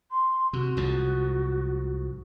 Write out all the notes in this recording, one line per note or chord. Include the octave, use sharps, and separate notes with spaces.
C6
C3 F#4
C2 G#2 F3